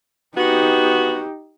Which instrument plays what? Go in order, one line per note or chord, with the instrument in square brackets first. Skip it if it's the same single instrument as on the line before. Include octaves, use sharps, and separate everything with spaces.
[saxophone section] B3 F#4 [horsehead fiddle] D#4 G4